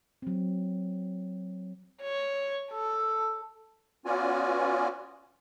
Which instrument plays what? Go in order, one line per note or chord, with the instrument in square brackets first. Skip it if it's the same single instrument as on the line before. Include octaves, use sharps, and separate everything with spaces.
[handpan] F#3 C4
[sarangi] C#5
A4
[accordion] B3 C#4 F4 F#4 D5 G#5